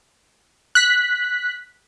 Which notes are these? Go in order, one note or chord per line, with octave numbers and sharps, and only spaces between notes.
F#6 B6